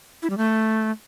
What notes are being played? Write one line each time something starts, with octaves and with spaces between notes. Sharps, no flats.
E4
G3
A3